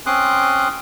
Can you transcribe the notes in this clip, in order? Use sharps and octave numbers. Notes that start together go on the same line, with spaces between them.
C4 C#4 C6 D6 D#6 F#6